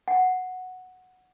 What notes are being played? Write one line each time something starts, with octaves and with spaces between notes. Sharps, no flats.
F#5